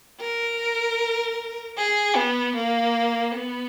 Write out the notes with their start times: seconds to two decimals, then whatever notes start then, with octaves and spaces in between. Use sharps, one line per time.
0.20 A#4
1.78 G#4
2.16 B3
2.56 A#3
3.35 B3